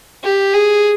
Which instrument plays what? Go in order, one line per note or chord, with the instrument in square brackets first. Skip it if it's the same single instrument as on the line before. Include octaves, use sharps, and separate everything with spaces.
[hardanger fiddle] G4
G#4